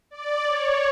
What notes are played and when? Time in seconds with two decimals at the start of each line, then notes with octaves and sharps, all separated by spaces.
0.11 D5
0.45 C#5